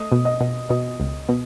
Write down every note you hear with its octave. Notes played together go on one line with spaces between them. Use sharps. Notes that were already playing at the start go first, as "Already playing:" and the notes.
Already playing: A3 D#5 D#6
B2
D#5 D#6
B2
B2 D#5 D#6
C#2
B2